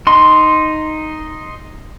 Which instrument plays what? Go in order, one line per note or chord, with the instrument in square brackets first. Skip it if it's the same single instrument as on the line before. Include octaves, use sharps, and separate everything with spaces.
[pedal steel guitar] D#4 C6